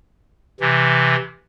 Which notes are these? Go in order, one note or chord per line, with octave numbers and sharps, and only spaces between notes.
C3 E3